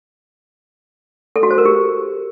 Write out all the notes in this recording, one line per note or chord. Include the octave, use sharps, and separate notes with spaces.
A4
F#4
C5
A#4
G4